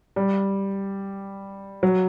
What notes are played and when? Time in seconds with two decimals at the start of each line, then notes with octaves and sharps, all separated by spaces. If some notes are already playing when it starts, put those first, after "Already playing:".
0.16 G3
1.83 F#3